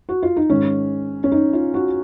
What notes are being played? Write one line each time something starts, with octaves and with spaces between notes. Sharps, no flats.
F#4
F4
D#4
G#2 D#3 C#4
C#4
D#4
F4
F#4